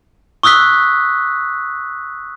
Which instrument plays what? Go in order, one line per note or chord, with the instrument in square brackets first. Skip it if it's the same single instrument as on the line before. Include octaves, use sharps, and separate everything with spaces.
[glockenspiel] C#6 D#6 E6 F#6 B6